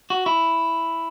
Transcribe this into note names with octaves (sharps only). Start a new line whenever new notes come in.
F#4
E4